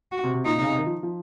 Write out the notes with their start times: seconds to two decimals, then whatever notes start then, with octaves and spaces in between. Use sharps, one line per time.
0.12 F#4
0.24 C3
0.34 C3
0.46 A#2 D#4
0.54 C3
0.61 C#3
0.70 C3
0.78 D#3
0.86 F3
1.03 F3